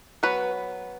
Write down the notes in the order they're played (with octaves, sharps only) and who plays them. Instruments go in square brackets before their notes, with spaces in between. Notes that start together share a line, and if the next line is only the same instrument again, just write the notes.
[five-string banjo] F#3 B3 B4